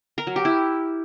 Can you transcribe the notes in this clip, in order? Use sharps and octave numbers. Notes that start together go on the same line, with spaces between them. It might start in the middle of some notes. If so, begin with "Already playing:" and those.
A#4
F#3
G4
E4